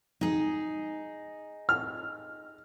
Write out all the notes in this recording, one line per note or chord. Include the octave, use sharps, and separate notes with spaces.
D#4 G#4
F6